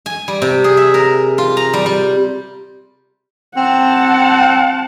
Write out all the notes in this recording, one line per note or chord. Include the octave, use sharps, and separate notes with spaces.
G#5
G3
C3
G#4
E5
A#4
F4
A#5
G3
G3
C4 F#5 A5